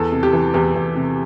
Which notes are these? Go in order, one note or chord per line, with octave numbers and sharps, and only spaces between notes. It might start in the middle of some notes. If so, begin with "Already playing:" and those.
Already playing: E2 A4
C3
G4
E3
E2 G4
E2
C3